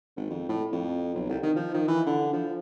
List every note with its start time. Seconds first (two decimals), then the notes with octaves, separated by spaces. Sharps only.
0.16 G#1
0.30 F2
0.49 A2
0.72 F2
1.14 B1
1.29 C2
1.43 D#3
1.56 F3
1.74 D#3
1.88 E3
2.06 D3
2.33 F3